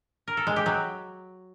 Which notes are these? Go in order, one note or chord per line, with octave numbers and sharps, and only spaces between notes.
A#4
A4
G#3
G4
F#3